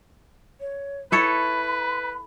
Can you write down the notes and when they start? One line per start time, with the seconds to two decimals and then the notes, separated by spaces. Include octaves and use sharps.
0.60 C#5
1.12 E4 A4 B4 C#5 B5